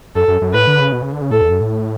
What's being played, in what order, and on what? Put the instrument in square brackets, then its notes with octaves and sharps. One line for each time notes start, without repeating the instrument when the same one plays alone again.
[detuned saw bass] F#2 [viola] A4
[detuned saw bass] F#2
F#2
[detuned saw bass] A2 [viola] B4
[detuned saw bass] D3
C#3
B2
C#3
D3
C#3
[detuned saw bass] A2 [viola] A4
[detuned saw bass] E2
F#2
A2